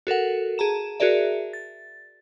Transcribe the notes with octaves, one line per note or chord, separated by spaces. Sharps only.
F#4 A4 A#4 F#5
G#4 A5 A#5 E7
F#4 G#4 A#4 D5 E5
A6